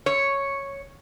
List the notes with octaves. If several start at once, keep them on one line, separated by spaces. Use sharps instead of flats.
C#5